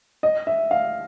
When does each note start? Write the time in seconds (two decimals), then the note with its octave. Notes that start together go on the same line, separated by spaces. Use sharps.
0.23 D#5
0.47 E5
0.71 F5